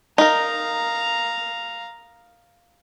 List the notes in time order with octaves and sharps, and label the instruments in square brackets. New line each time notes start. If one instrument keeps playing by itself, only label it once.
[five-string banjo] D#4 A#4 [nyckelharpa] F5 A#5